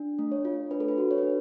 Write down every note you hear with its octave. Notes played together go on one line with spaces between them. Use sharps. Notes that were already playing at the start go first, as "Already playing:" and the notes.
Already playing: D4
A3
C#5
F4
D4 B4
A4
B4
F#4
C#5
B4
D4